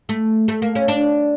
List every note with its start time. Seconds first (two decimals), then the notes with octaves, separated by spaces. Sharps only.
0.09 A3
0.48 A3
0.62 A#3
0.75 C#4
0.88 D4